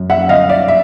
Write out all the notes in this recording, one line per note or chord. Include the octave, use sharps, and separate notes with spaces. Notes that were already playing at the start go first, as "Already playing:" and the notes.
Already playing: F#2
E5 F#5
G1 D#5 F5
D5 E5
E5